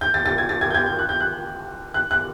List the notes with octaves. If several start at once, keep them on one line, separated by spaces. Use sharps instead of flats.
G6
A6
A6
G#6
A6
G#6
G6
G#6
G6
F#6
G6
F#6
F#6
F#6